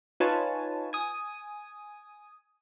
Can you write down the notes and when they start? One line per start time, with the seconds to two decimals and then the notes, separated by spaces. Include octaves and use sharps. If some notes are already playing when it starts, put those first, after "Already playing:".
0.20 D#4 F4 B4 C#5 G#5 A5
0.93 G#5 D#6